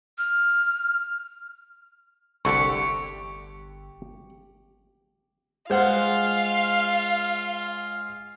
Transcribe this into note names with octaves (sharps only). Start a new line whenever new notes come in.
F6
G1 C2 D3 A3 G4 C#6
G#3 F4 C5 F5 F#5